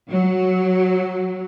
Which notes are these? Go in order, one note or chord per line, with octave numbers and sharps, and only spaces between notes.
F#3